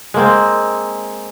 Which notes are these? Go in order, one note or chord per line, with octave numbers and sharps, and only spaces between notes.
G#3 A#3 C4